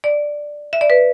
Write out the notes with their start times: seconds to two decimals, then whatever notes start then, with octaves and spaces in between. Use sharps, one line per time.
0.04 D5
0.73 E5
0.81 D5
0.90 B4